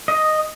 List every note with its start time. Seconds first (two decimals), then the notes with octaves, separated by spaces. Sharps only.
0.08 D#5